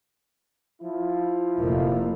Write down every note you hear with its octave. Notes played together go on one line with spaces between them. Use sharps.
F3 E4
F1 A3 A#3